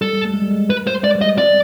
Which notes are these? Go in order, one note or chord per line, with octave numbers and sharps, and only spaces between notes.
G3 A4
G3
A3
G#3
G3
G#3
B4
C5
G#3 D5
G3
D#5
G3
C4 D5